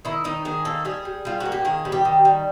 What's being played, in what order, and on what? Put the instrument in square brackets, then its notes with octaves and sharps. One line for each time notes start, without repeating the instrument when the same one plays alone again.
[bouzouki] D#3 E4
D#3 D#4
D#3 G#4
A#3 A4
G3 G#4
G3
G3 F4
F#4
A#3
G4
D#3 G#4
G3
G4
D#3
G3